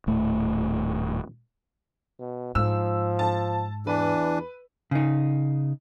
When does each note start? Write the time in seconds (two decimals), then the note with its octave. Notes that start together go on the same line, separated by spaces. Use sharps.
0.07 D#1 A2 A3
2.20 B2
2.55 G#2 F3 E6
3.19 A5
3.87 E2 E3 D4 B4
4.91 C#3 D#4